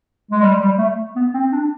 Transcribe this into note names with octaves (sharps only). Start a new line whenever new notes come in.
G#3
G3
G3
A3
B3
C4
D4